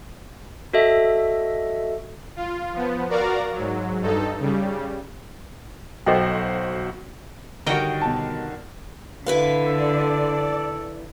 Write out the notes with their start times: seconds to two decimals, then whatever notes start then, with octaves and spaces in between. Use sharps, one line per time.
0.73 F#4 A4 D#5 E5
2.36 F4
2.74 F3 B3
3.09 F#4 A#4 D5 F5 A#5
3.53 G#2 F#3
4.01 G2 D#4 A4
4.39 C#3 G3
6.06 B1 F#4 A4 C5 D#5 G5
7.67 D3 D#3 G3 F#4 A#4 C#5 D#5 G5
8.01 B2 A5
9.26 D3 E4 B4 F5
9.66 A4 D5